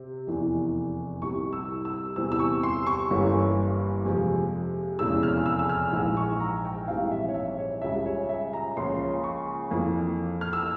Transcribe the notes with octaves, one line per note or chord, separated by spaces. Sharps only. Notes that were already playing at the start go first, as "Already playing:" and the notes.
Already playing: C3 C4
F1 E2 E3
C2 C3 G3 C#6
E6
E6
E2 C3 E3 G3 C4 E6
E6
C#6
C6
C#6
G1 G2 E3 A#3 C#4
F2 C3 F3 G#3
F1 E2 C#3 E3 G#3 E6
F6
E6
E6
F6
A#1 G#2 E3 G#3 E6
C#6
A#5
G5
A#1 G#2 E3 G3 C4 F5
E5
C#5
E5
C#5
C#2 C#3 G3 E5
C#5
E5
A#5
C#2 C#3 F3 A#3 C#4 C6
C#6
F2 E3 A#3
F6
E6